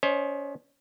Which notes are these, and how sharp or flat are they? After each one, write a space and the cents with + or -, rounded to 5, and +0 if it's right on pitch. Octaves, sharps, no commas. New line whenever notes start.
C#4 +25 C5 +30 D#5 +0